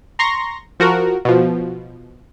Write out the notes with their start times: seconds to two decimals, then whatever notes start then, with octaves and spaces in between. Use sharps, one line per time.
0.19 A#5 C6 C#6 A#6
0.80 F3 F#4 A#4
1.25 B2 F3